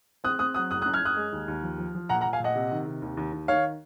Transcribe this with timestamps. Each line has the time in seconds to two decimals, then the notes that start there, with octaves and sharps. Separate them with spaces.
0.24 C4 D#6 F#6
0.39 C4 D#6 F#6
0.54 F#3 D#6 F#6
0.70 F#1 D#6 F#6
0.81 D#6 F#6
0.86 F#2
0.94 F6 G#6
1.02 F#2 D#6 F#6
1.16 G#3
1.32 D#2
1.48 D#2
1.63 F3
1.78 F3
1.95 F3
2.09 A#2 F#5 A#5
2.21 F#5 A#5
2.25 A#2
2.33 F5 G#5
2.40 A#2 D#5 F#5
2.55 C3
2.71 D#3
2.87 C3
3.02 D#2
3.17 D#2
3.32 D#2
3.48 D#3 C#5 F5